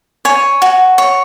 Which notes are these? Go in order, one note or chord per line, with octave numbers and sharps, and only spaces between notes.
C#5 G#5
F#4
C#5